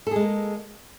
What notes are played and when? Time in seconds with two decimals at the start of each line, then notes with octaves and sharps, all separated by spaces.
0.07 A4
0.11 G#4
0.16 G#3
0.20 A#3